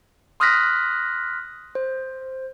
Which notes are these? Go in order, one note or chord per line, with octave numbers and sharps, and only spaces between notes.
C6 D#6 F6 F#6 A#6 B6
C5